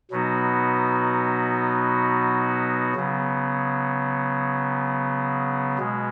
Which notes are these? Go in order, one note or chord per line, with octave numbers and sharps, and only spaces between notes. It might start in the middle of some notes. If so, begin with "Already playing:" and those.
B2 F#3 B3 D#4 F#4
C#3 F#3 B3
B2 G#3